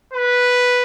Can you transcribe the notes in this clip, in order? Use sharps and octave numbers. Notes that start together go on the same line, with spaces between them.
B4